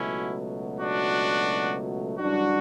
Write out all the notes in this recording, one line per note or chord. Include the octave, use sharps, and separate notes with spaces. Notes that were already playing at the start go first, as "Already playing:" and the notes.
Already playing: C#2 B2 F#3 A3 C#4 E4
D4 F#4
F#2 C#3 E3 G3 D4 F#4